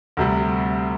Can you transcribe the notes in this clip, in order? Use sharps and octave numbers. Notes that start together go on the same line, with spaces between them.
D2 C3 G3